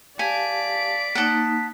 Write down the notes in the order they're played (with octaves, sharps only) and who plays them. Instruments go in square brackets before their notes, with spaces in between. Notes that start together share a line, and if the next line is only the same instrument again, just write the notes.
[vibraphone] G4 F5 A5 [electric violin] D5 D7 [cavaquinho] G#5 [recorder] B6
[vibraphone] A#3 D#4 D#6 [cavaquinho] F#5 A5